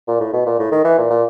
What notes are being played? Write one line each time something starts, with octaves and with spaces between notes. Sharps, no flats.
A#2
A2
B2
A#2
A2
D#3
E3
A#2
A#2